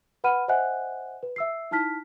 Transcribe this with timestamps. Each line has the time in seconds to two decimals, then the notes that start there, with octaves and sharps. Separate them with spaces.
0.24 B4 F#5 B5 F6 D#7
0.48 C5 D#5 E5 F#5 G#5 F#6
1.23 B4
1.36 E5 E6 C7
1.71 D#4 E4 A5 F6 B6